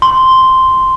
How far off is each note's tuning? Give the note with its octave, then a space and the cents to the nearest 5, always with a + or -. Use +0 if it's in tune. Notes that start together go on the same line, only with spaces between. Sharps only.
C6 -5